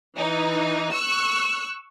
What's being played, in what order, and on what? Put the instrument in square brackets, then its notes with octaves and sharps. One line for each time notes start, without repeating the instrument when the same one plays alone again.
[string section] E3 D#4
C#6 E6 F#6